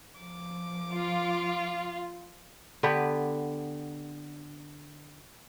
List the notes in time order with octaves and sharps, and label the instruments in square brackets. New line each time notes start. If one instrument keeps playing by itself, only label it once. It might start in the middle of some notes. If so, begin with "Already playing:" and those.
[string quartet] F3 D6
[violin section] F4
[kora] D3 B3 G4 B4